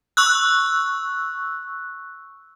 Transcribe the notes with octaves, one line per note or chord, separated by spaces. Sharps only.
C#6 E6 F#6